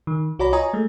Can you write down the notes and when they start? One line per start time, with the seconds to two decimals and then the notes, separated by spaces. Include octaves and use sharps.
0.07 D#3
0.39 C2 F#4 C#5 D5 A#5 B5
0.53 F4 C#5 D#5 G#5 A#5 D#6
0.73 G#3 A3